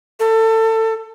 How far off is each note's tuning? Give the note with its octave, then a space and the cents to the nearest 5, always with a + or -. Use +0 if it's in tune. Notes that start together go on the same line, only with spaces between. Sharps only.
A4 +25